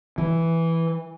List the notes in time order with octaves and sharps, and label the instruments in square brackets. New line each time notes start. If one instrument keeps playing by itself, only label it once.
[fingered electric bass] E3